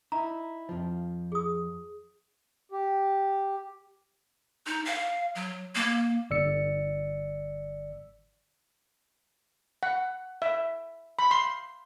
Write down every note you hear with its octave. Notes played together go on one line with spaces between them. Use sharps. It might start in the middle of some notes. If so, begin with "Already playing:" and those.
D#4 E4 A#5
F2 F3
G#4 D#6
G4
D#4
F5
F#3
A#3
G1 D5 E6 C#7
F#5
E5
B5
C6